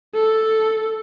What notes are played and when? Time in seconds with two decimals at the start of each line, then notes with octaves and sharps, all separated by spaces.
0.15 A4